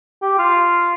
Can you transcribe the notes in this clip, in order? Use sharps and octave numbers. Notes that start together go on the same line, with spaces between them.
G4
F4